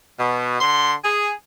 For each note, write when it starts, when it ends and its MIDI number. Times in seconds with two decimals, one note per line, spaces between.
0.18 0.58 47
0.60 0.94 50
0.60 0.94 84
1.04 1.31 68